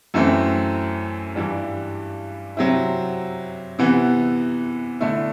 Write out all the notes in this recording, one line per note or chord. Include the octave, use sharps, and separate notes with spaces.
F#2 E3 A3 C4
G2 E3 G3 D4
C3 F#3 C4 E4
C3 E3 B3
D3 A3 E4